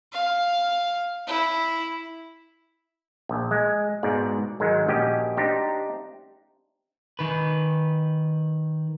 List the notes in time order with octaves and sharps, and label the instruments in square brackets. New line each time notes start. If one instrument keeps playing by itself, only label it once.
[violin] F5
E4
[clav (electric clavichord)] A#1
G#3
G#2 B2 D5
G#2 D#3 F#3 G#3
A#1 C#4 F#4 G4 D#5 G5
D4 D#4 G4 C5
[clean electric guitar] D#3 B4